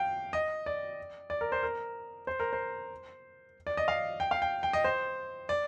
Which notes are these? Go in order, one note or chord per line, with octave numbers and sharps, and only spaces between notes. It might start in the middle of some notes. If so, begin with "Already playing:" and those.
Already playing: F5 G5
D#5
D5
D5
A#4
C5
A#4
C5
A#4
C5
D5
D#5
F5
G5
F5
G5
G5
D#5
C5
D5